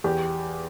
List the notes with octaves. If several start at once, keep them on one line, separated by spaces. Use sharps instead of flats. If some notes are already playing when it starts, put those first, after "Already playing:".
E2 G4